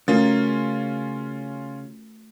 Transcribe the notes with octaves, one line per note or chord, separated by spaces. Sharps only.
C#3 A3 C#4 F4 F#4 A#4 A6